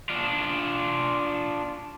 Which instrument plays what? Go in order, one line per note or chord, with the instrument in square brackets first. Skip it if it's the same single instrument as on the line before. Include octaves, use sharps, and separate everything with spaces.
[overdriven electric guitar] D4 F4